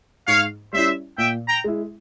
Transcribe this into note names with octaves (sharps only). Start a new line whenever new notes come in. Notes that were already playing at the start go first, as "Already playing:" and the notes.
G#2 C#5 F5
G3 C#4 E4 C5 E5
A#2 E5 G5
G5 A#5
G#3 E4